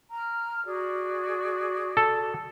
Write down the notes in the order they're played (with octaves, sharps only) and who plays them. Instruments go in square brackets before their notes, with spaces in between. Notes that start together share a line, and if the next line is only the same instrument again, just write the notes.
[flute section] A#5 F6
F#4 G#4 D5
[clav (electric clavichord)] A4